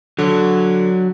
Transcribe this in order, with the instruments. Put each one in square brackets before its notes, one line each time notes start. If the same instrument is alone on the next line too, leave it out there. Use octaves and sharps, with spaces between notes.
[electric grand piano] D3 [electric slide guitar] F#3